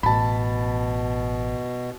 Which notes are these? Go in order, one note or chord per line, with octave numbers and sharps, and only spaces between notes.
A1 B2 A5 B5